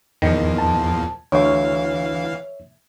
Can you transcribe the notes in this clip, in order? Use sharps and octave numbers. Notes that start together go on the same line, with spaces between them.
E2 A#2 D#3 F3
A5
D2 E3 C#5 E5 F5